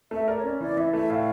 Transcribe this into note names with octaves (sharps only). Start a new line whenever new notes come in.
A3 E5
A#4 D5
C#5
C#4 D5
E3 D5
E3 E5
A3 E5
A2 F5